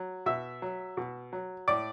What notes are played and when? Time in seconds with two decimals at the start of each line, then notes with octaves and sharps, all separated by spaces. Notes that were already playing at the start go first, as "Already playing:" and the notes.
Already playing: F#3
0.26 B2 E5
0.62 F#3
0.97 B2
1.33 F#3
1.68 A2 D5